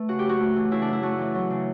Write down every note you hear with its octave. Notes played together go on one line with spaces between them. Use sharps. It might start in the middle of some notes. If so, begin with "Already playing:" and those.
Already playing: A3 B4
C#3 F#4
G4
F#2 F#4
A3
E3
C#3 E4
D4
F#2 E4
A3 F#4
E3
F#3
C#3